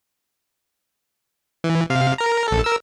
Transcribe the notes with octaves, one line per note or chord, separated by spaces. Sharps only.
E3
C3 F5
A#4 A#5
A#1 A4
A#4 E6